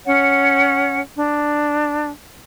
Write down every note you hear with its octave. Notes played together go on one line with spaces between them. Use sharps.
C#4 C#5 F#5
D4